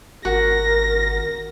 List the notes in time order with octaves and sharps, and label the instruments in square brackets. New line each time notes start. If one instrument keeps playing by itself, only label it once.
[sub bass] G#1 [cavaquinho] F#4 [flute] A#4 [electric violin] A#6